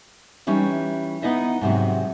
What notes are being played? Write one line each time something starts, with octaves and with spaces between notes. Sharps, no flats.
E3 G3 C#4 D#4
B3 D#4 E4 D#5 E5
G#2 C3 F#3